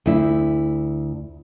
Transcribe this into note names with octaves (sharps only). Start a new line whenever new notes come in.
D2 E4